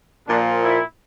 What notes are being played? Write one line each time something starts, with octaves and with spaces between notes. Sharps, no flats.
A#2 F3 D4
E4